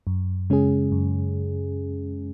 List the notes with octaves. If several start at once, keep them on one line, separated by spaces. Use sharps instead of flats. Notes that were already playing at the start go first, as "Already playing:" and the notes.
F#2
C#3 G#3 C#4 G#4
F#2